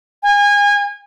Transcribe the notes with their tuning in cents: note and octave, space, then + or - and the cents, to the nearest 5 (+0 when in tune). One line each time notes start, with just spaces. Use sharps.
G#5 -30